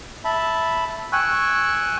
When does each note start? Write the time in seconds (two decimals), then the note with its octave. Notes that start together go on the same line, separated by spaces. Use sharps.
0.25 E5 A5 B5
1.13 G5 G#5 C#6 E6 F#6